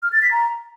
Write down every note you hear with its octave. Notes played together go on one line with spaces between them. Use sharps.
F6
A6
B6
A#5